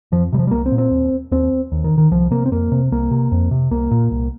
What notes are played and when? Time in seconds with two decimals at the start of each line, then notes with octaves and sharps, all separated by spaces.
0.12 F2 F3
0.33 C3 G3
0.39 F3
0.47 G3
0.51 C2 A#3
0.66 C4
0.72 A#2
0.78 C4
0.91 D#2
1.31 D#2 C4
1.72 D#2
1.84 D#3
1.98 D#3
2.11 C2 F3
2.31 C3 A#3
2.46 C4
2.52 F2 A#3
2.72 C3
2.92 C2 A#3
3.11 C3
3.32 F2
3.51 C3
3.71 C2 A#3
3.91 A#2
4.11 C2